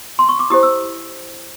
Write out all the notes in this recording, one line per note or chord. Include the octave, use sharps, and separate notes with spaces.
C6
C#6
D6
E4 G4 C5 D#6
E6